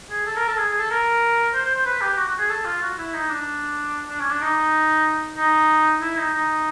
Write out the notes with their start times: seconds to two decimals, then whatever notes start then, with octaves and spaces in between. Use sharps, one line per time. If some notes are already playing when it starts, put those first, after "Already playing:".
0.10 G#4
0.26 A4
0.36 A#4
0.47 A4
0.57 G#4
0.68 G#4
0.79 A4
0.90 A#4
1.54 C5
1.64 C5
1.75 C5
1.85 B4
2.01 G4
2.17 F#4
2.28 F#4
2.38 G#4
2.49 A4
2.65 F4
2.82 F#4
2.98 E4
3.13 D#4
3.29 D4
4.09 D4
4.20 C#4
4.30 D4
4.41 D#4
5.37 D#4
6.01 E4
6.17 D#4
6.33 D#4